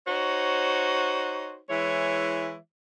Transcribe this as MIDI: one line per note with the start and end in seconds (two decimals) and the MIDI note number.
0.07 1.58 63
0.07 1.58 66
0.07 1.58 72
0.07 1.58 73
1.70 2.56 52
1.70 2.56 56
1.70 2.56 64
1.70 2.56 73